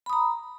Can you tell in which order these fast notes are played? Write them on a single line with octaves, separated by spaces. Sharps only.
B5 D#6 A#5